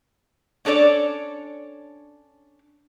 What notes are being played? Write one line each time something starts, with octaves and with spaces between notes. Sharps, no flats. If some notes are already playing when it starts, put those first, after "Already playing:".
C#4 D4 A4 C#5 D5